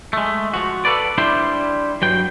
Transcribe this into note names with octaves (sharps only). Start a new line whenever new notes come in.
G#3 A3
F3 F#4
A4 B4 D5
G3 D4 E4 C5 G5
G2 F#3 G5